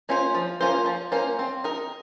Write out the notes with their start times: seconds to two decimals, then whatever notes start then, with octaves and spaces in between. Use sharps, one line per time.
0.09 A#3 C#4 F4 C5
0.35 F3
0.61 A#3 C#4 F4 C5
0.86 F3
1.12 A#3 C#4 F4 C5
1.39 C4
1.64 D#4 A#4